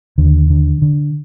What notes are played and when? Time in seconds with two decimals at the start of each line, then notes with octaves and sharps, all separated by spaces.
0.18 D#2 D3
0.50 D3
0.82 D3